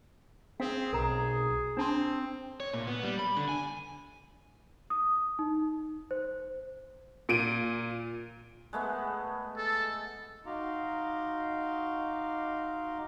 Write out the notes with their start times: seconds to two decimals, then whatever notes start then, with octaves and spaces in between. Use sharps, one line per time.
0.60 C4 G#4 F5
0.93 B1 A#4 A#5
1.77 C4 D4 A5 C6
2.60 C#5
2.73 A#2
2.87 B3
3.03 G3
3.19 B5
3.37 D3
3.49 G#5
4.90 D#6
5.39 D#4
6.11 C5
7.29 A#2 D7 D#7
8.73 G#3 A3 B3
9.57 A4
10.46 D#4 F#4 F5 A#5 C6 D6